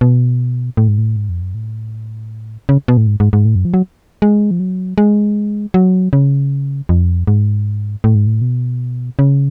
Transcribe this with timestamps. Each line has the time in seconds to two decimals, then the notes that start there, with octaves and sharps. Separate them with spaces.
0.01 B2
0.77 A2
0.88 G#2
0.98 A2
1.16 G#2
1.29 F2
1.42 F#2
1.54 A2
2.69 C#3
2.88 B2
2.97 A2
3.07 G#2
3.20 G#2
3.33 G#2
3.45 A2
3.55 F#2
3.65 F3
3.74 F#3
4.22 G#3
4.51 F3
4.60 F#3
4.98 G#3
5.74 F#3
6.13 C#3
6.89 F2
7.27 G#2
8.04 A2
8.15 G#2
8.27 A2
8.41 B2
9.19 C#3